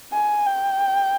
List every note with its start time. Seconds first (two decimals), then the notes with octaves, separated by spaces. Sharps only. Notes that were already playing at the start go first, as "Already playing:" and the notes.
0.13 G#5
0.46 G5